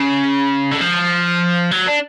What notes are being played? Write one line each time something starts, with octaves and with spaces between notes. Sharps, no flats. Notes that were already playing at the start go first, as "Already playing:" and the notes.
Already playing: C#3
D3
F3
F#3
D4